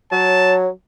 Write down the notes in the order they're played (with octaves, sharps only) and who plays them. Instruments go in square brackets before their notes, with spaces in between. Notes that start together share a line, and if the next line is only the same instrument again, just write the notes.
[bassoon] F#3 [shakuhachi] C#5 [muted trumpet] A5